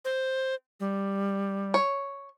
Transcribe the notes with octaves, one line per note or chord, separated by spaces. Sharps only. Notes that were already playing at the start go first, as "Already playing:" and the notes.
C5
G3
C#5